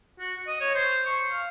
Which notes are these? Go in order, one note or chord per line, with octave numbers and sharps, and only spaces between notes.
F#4
D#5
C#5
C5
C#6
F5